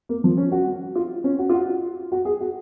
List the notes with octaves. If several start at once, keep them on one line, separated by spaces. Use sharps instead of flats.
A#3
F3
C#4
F#4
F4
C#4
F#4
F4
F#4
F#4
G#4
F#4